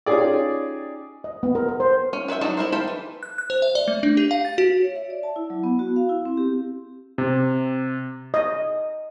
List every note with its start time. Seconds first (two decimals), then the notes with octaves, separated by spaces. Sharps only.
0.06 C#4 D#4 F4 G4 G#4 D5
1.24 D#5
1.43 B3
1.55 A#4
1.68 A#4
1.80 C5
2.13 C#4
2.28 F#4 B4 C#5 E5 G5
2.41 F#3 D4 D#4 A4
2.57 E4 A#4 C5
2.72 A4 C5 F5 G5 B5
2.88 E3
3.23 F#6
3.38 F#6
3.50 C5
3.62 E5
3.75 D5
3.88 A3
4.03 D4
4.17 G4
4.31 F5
4.45 A6
4.58 F#4
4.82 C#5
4.96 E5
5.10 D5
5.23 A5
5.36 E4
5.50 F#3
5.63 B3
5.79 F#4
5.96 F5
6.09 E4
6.25 C4
6.37 G4
7.18 C3
8.34 D#5